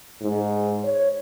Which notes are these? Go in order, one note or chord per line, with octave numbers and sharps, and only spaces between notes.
G#2
C#5